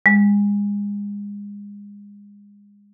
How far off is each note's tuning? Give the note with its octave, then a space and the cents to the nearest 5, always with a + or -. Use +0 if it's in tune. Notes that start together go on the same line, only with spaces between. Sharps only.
G#3 -30